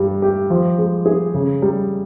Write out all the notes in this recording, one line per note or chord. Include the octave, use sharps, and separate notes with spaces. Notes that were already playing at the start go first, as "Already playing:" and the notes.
Already playing: G2 G3
G4
F3
G#3
G#4
C#3
G3